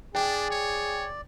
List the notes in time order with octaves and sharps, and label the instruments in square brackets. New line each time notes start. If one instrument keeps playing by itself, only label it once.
[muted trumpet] D4 [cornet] G#4 [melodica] D5 [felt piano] G5
[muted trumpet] C#5